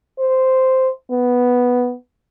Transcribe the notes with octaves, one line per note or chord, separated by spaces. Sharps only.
C5
B3